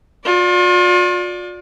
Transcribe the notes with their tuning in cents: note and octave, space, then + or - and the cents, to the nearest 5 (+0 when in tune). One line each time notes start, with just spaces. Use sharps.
F4 +40 D5 +0